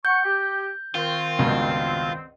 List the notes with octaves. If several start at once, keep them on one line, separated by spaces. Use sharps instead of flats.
F#5 C#6 G6
G4
D#3 C4 F4
C#2 G2 B2